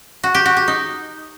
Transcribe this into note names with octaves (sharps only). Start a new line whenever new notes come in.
F#4
G4
F#4
G4
D#4